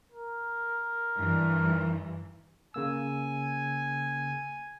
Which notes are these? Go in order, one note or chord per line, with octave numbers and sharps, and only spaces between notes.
A#4
G2 E3
C#3 A#3 G#5 E6